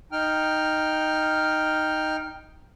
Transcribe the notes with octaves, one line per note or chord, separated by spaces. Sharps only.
D#4 G5 F6